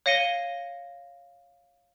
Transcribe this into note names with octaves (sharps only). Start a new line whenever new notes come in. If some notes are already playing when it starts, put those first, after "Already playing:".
C#5 F5 A#6 C#7 D#7 G7